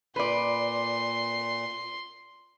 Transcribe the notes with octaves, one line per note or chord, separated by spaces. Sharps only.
A#2 B4 D5 C6